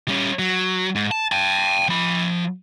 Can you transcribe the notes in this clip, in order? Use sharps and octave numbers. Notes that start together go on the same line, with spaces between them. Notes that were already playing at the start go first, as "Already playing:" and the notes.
G3 C#4
F#3
G#2
A5
G5 A5
F3 B5